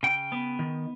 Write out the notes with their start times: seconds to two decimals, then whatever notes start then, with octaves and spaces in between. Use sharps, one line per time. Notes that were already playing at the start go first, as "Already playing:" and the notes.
0.03 C#3 G5
0.32 B3
0.59 D#3